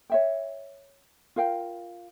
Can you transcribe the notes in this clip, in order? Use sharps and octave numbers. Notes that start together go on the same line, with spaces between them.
C#5 E5 G5
F4 A#4 F5 G5